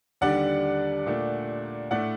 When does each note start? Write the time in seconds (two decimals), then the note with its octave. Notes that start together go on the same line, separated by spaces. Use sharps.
0.21 D#2 D3 G3 D4 D5 F#5
1.06 A#2 A3 D4
1.91 A2 A3 D4 D5 F#5